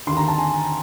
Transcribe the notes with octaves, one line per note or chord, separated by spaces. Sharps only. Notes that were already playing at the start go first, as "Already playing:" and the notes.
D#2 D3 C6
A#5
A5
G#5